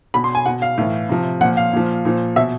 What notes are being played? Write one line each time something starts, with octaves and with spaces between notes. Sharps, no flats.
B2 B5
C6
G#5
B2 F#5
F5
A2 E3
C3 F3
A#2 F3 F#5
F5
A#2 F3
A#2 F3
B2 E5